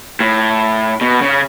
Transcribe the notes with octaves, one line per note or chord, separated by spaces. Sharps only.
A2
B2
C#3